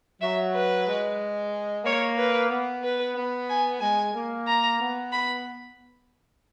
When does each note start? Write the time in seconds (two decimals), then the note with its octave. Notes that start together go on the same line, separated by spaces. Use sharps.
0.21 F#3 E5
0.54 B4
0.87 G#3
1.85 A#3 C#5
2.17 B4
2.50 B3
2.83 B4
3.16 B3
3.49 G#5
3.81 G#3 G#5
4.14 A#3
4.47 A#5
4.80 B3
5.12 B5